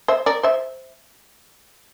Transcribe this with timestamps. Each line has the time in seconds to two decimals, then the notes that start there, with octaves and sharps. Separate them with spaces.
0.08 C5 E5
0.26 A#4 D5
0.43 C5 E5